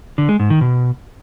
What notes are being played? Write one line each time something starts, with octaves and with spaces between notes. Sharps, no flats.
D3
G#3
G#2
D#3
B2